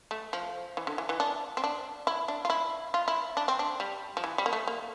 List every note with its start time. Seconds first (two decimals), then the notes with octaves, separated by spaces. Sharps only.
0.11 A3
0.33 F3
0.77 E3
0.87 D3
0.98 E3
1.09 E3
1.20 D4
1.57 C4
1.64 D4
2.07 E4
2.28 D4
2.45 F4
2.50 E4
2.94 F4
3.08 E4
3.37 D4
3.48 C4
3.59 D4
3.80 G3
4.17 F3
4.24 E3
4.38 G3
4.46 A#3
4.53 A3
4.67 A#3